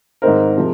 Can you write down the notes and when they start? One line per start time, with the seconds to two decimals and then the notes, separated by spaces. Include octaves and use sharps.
0.22 G#2 D#3 C4 A#4
0.57 C3 F3 G#3